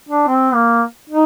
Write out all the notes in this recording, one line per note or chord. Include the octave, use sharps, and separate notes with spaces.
D4
C4
A#3
D#4